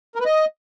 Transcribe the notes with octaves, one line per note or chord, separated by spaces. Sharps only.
A#4
B4
D#5